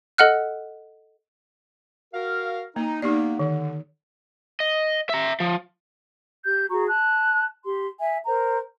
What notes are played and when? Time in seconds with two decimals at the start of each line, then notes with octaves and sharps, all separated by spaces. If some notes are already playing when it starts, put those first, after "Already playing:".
0.18 A4 D#5 F#5 F6 F#6
2.14 F#4 A#4 F5
2.76 A#3 D#4
3.02 A#3 B3 D#4 G4 D5
3.39 D3 D#3
4.60 D#5
5.09 E5 A#5
5.40 F3
6.44 G4 G6
6.70 F#4 G#4 A#5 C#6
6.88 A5 F#6
7.65 G4 C6
7.99 E5 G#5
8.25 A#4 C5 A#5